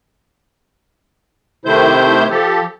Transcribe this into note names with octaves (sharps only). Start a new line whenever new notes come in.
C3 D#3 A3 E4 C5 G6
F3 G4 A4